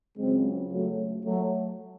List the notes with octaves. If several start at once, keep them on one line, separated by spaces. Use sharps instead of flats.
C#2 C#3 F#3 G#3 C4
F#3 A3
F#3 A3